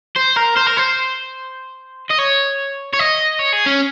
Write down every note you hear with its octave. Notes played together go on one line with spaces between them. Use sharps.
C5
A#4
C5
A#4
C5
D#5
C#5
C#5
D#5
C#5
G#4
C#4